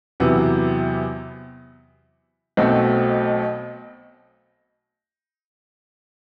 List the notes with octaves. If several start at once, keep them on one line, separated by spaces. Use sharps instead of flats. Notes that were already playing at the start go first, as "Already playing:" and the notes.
E2 C3 F#3 B3 E4
B1 B2 A3 C4 F#4